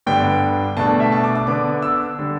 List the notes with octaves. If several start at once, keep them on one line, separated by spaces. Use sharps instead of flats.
G2 D3 G3 B3 D4 G5
B2 A3 D4 A5
E5
A5
D6
D6
D3 B3 D4 D6
E6
D3 G3